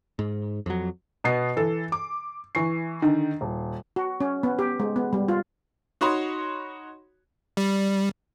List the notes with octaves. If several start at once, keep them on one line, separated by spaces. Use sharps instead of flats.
G#2
F2 F#3
B2 B3 C7
E3 A4
D6
E3 C#6 C7
D3 D#3
D#1
F#4
C#4
B3
G4
G#3
B3
G3
F4
D#4 F#4 C#5 B5 C6 D#6
G3